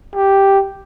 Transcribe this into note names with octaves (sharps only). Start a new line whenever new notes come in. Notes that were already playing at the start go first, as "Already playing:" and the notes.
G4